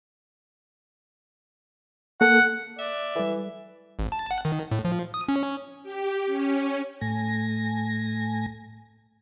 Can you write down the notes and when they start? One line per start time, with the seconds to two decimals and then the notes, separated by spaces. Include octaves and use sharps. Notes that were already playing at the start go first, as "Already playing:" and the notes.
2.21 A#3 A4 F#5
2.79 D5 E5
3.15 E3 G3 A4
3.99 G#1
4.12 A5
4.31 F#5
4.45 D#3
4.71 A2
4.85 F3
5.14 D#6
5.28 C#4
5.83 G4
6.26 C#4
7.01 A2 A3 G#5 A#6